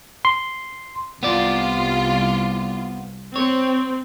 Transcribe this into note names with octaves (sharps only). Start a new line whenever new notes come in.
C6
C2 B3 F4 D5
C4 C#5